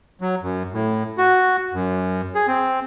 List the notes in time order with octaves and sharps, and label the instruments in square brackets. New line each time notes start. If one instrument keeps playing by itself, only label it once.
[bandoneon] F#3
F#2
A2
F#4
F#2
G#4
C4